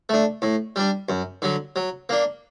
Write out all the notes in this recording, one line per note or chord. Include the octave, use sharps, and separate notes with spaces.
A3 D4
A2
G3 D4
F#2
D3 F#3
F#3
A#3 D4